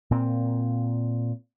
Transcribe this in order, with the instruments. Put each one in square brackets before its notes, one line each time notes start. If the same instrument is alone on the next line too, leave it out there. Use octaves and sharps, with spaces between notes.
[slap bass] A#2 C4